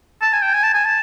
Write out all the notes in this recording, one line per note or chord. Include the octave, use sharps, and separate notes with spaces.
A5
G#5
G5
G#5
A5
G#5
A5